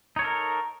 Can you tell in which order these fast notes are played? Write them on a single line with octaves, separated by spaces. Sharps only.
D#4 C#5 A4 A#4